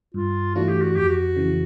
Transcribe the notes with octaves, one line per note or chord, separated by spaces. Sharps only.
G2 F4
E3 A3 D4 F4 F#4
G4
F#4
F2 G4
F#4
C#3 E3